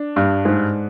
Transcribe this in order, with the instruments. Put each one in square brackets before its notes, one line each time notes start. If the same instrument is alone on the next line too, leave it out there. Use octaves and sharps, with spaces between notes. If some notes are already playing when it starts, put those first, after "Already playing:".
Already playing: [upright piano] D4
G2
G#2